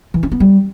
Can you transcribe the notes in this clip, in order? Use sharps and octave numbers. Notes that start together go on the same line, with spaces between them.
E3
C#4
B3
G3